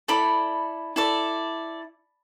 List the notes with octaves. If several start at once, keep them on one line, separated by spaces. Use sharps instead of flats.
E4 A4 D5 B5
E4 A4 D5